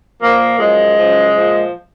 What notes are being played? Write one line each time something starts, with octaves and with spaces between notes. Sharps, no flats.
A#2 F3 A#3
F#2 F3 G#3
F#2 C#3 F3
A#2 F3